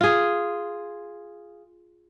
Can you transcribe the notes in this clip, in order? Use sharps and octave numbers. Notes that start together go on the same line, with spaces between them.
F4 G#4